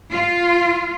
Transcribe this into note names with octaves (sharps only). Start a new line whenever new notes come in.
F4